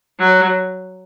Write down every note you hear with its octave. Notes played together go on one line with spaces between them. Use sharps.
F#3